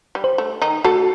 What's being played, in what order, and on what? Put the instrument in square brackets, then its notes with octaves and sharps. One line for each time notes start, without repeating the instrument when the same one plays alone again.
[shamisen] G3
[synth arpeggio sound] C5
[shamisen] A3
D#3 D#4
[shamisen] A3 A4 [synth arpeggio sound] F#4